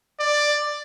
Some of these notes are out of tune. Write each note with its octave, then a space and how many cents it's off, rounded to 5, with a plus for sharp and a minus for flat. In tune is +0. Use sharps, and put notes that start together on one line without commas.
D5 +10